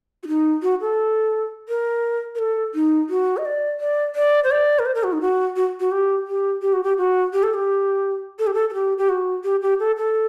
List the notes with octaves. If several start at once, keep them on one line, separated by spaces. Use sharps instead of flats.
F#4
D#4
F#4
A4
A#4
A#4
A4
D#4
F#4
D#5
D5
D5
D5
C5
D5
A#4
C5
A#4
F#4
D#4
F#4
F#4
F#4
G4
G4
G4
F#4
G4
F#4
G4
A4
G4
A4
G4
A4
A4
G4
G4
F#4
G4
G4
A4
A4